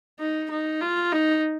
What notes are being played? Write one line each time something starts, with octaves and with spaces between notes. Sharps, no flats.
D#4
D#4
F4
D#4